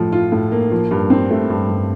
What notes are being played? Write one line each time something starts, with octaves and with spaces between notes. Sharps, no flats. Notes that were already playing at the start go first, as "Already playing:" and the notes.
Already playing: A2 F3
F4
A2
A#3
F3
G2
C4
A3
G2
G2